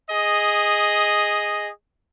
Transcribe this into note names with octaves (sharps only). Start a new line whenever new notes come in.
G#4 D#5